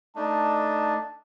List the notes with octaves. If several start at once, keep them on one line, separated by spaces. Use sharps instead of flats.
A3 D4 D#4 A5